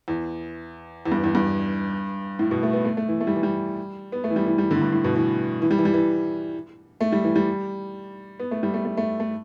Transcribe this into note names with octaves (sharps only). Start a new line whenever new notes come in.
E2
E2
G2
E2
G2
A2
B2
A3
B3
A3
A3
E3
A3
G3
E3
G3
B3
A3
E3
G3
E3
G3
D3
A2
G2
A2
B2
E3
E3
G3
E3
G3
E3
A3
G3
E3
G3
B3
A3
G3
A3
A3
A3
A3